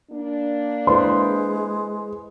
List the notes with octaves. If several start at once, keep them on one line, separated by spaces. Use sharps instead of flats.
A#3 D4
G#3 E4 B4 C5 C6